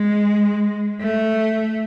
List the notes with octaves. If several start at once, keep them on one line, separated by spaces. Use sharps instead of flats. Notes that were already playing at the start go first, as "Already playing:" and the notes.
Already playing: G#3
A3